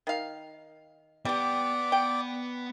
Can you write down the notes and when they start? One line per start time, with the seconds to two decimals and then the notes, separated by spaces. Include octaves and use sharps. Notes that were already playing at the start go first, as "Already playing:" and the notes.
0.07 D#3 F5
1.25 G3 B3 G4 D5
1.92 G5